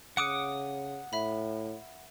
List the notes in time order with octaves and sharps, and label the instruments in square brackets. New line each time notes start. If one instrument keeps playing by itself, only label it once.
[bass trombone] C#3 [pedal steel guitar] F#5 D6 D#6 [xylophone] F#6 C#7 D7
[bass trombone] A2 [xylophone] E5 B5